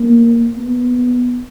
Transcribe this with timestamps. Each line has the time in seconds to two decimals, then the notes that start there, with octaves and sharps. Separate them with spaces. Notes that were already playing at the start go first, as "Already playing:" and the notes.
Already playing: A#3
0.57 B3